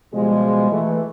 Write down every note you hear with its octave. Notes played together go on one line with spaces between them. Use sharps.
B2 F3 G3 G#3
E3 A3